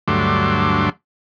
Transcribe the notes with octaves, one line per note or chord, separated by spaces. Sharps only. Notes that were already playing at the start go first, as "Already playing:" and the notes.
D2 G2 F#3 A3 C6 D6